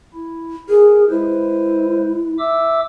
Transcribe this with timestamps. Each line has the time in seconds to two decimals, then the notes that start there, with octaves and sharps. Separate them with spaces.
0.14 E4
0.69 G#4 A#4
1.10 G#3 E4 B4 C5
2.39 E5 D6 E6